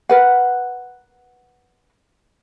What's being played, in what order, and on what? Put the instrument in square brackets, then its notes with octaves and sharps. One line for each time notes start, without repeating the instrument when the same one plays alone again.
[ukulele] A#4 B4 F#5